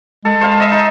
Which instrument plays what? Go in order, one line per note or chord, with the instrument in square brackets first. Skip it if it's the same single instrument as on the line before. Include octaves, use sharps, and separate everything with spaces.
[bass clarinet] G#3 [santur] A4
[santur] C5 F5 B5
D#5 E5
D#4